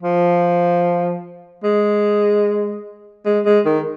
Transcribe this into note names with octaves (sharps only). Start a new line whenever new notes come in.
F3
G#3
G#3
G#3
D#3